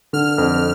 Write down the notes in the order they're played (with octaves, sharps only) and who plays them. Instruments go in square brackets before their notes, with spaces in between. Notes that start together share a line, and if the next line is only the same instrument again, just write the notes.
[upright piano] D3 [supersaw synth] F6
[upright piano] F2